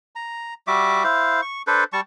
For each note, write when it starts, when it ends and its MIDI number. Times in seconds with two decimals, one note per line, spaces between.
0.15 0.54 82
0.67 1.04 55
0.67 1.04 66
0.67 1.04 76
0.67 1.04 86
1.04 1.41 64
1.04 1.41 72
1.04 1.41 77
1.42 1.62 85
1.67 1.84 62
1.67 1.84 69
1.67 1.84 71
1.67 1.84 72
1.93 2.01 55
1.93 2.01 81
1.93 2.01 85